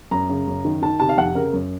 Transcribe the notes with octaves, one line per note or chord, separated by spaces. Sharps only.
F#2 A#5
C#3
F#2
D#3
D#3 A5
C3 A5
F5
F2 F#5
C#3 A#4
F#2